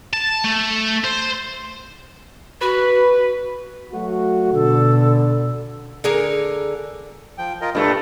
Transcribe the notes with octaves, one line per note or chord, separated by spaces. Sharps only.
A5
A3
C5
F#4 B4
F#3 A3 F#4
B2 D3 A4
D3 G#4 A#4
F3 G5
F4 A#4 D#5
G2 E3 F3 A3 A#3
A#2